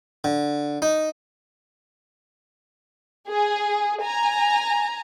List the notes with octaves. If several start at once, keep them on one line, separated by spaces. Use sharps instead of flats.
D3
D#4
G#4
G#5 A#5